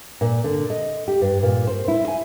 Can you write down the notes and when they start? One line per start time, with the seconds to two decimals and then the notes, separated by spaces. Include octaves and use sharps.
0.21 A#2
0.44 D3
0.70 D#5
1.08 G4
1.21 G2
1.43 A#2
1.67 C5
1.88 E4
2.08 G#5